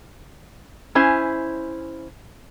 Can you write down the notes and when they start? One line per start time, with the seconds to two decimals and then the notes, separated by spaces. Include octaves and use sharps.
0.95 C#4 E4 C5 G#5